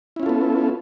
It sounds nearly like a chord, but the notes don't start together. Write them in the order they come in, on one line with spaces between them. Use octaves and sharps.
E4 C#4 F4 A4 B3